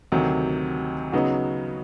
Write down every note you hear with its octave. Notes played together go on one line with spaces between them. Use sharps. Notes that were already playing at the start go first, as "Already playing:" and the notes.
D2 C3 D#3 F#3
C#3 F#3 B3 D#4 F#4